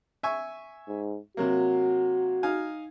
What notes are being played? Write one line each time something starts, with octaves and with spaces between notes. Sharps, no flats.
E5 G#5 C#6
G#2
C3 F#3 A#3 F#4
D#4 F5 G#5